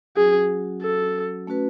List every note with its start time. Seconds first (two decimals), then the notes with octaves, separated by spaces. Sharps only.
0.16 F#3 C#4 F#4 G#4
0.82 A4
1.47 A3 C#4 F#4 B4